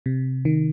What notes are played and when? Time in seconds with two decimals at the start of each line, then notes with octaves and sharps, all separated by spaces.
0.06 C3
0.45 D#3